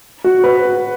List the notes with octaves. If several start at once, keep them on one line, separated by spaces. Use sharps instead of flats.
F#4
B4